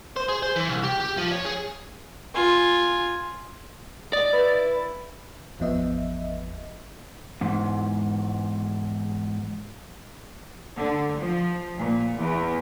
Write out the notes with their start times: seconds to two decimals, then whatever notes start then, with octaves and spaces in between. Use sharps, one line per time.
0.17 C5
0.29 G#4
0.42 C5
0.56 E3
0.69 C2
0.83 G4
1.00 G4
1.17 F3
1.31 C#5
1.45 G#4
2.35 F4 G#5
4.13 D5 D#5
4.33 E4 B4
5.59 G#1 E2 F3 B3 D#5 E5
7.41 E2 G#2
10.77 D3
11.20 F3
11.78 A#2
12.19 E2